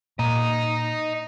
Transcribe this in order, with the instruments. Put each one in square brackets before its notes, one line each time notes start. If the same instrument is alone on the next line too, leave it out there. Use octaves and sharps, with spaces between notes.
[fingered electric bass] A#2 [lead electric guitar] D#5 A#5